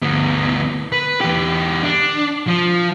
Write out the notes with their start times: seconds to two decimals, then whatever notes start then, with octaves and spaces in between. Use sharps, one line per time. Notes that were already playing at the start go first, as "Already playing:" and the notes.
0.02 D2 B3
0.92 B4
1.21 E2 G4
1.82 D4
2.47 F3